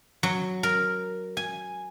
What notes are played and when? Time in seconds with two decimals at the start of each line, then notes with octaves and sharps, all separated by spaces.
0.23 F#3
0.63 A#4
1.37 G#5